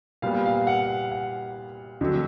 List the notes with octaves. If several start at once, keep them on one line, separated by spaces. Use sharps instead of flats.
A#2 G3 B3 F5
F5
F#5
F#5
F2 D3 F#3 A3